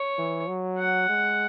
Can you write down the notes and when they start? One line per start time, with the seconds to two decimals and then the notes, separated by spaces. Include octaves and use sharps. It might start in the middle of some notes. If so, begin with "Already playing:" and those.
Already playing: C#5
0.18 E3
0.48 F#3
0.78 F#5
1.09 G#3